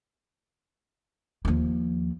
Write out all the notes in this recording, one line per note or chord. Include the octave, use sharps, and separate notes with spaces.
D#2 F3